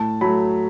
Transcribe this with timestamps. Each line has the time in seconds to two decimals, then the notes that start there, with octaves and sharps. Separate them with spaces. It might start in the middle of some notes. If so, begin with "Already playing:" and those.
Already playing: A2 A5
0.21 F#3 A3 B5